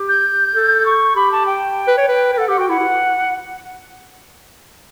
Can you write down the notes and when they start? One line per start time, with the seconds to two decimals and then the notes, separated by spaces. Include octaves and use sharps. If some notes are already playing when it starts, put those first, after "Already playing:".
Already playing: G4
0.08 G6
0.55 A4
0.86 C#6
1.16 G4 B5
1.32 A5
1.46 G5
1.87 B4
1.97 C#5
2.08 B4
2.34 B4
2.38 A4 F#5
2.48 G4 F#5
2.59 F#4 G5
2.69 E4 F#5
2.79 E4